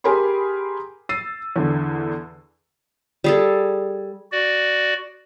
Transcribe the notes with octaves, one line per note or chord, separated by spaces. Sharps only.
G4 G#4 A#4 G#5 B5 C6
E6 A6 C7 D#7
E2 D3
G3 G#4 A4
F#4 D5